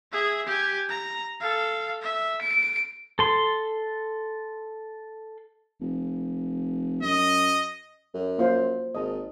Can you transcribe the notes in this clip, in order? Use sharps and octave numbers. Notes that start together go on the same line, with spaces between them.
G#4 E5
G4 G#5
A#5
A4 F5
E5
D7
A4 C6
F1
F#2 D#5
F#2
A#3 F4 C5
G#1 D#5 A5